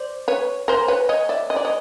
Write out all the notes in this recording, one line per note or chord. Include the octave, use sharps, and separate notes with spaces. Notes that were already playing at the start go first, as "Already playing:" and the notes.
Already playing: C5 D5
B4 C#5
A#4 C5
B4 C#5
C#5 D#5
D5 E5
D#5
D5
C#5 D#5